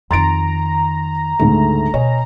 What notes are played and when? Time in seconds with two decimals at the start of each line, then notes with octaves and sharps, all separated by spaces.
0.11 F2 D#3 A#5 C6 A6 D7
1.39 D2 G#2 C#3 A3
1.94 B2 C#5 D#5 G#5